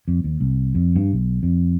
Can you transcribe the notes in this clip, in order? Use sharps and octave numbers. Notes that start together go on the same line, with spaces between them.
F2
D#2
C2
F2
G2
B1
F2